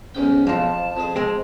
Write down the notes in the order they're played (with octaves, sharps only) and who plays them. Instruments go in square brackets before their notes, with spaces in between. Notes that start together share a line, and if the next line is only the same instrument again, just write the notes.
[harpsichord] B1 G#2 G5 [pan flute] C#4
[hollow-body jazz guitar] F2 F3 [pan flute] A5
[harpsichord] F2 F3 G#4
[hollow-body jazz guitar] G#3 C4